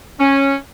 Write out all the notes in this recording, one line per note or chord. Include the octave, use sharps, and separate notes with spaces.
C#4